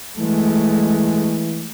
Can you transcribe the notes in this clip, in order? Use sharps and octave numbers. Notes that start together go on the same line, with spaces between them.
E3 G#3 A3